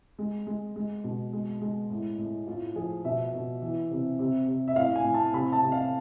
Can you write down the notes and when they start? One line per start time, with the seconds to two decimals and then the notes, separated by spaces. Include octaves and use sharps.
0.19 G#3
0.47 G#3
0.76 G#3
1.04 B2
1.33 G#3
1.61 G#3
1.90 A2
2.18 A2
2.47 A2 F4
2.75 F3 G#4
3.05 B2 E5
3.33 B2
3.62 E3
3.91 C3
4.19 C3
4.48 C3
4.68 E5
4.76 A2 F5
4.96 G#5
5.05 A2
5.14 A5
5.33 C3 B5
5.52 A5
5.62 C3
5.72 F5